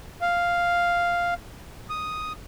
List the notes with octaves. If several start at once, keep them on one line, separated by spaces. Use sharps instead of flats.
F5
D#6